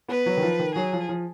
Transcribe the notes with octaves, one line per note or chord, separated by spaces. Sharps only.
B3 B4
F#3
D#3
F3
D#3
F#3 G#4
F3
F3